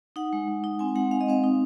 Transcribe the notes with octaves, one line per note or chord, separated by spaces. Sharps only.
D#4 F#5
G#3
G#3
D#4
C4 G#5
G#3 F#5
G#3 F5
D#5
C4 F5
D#4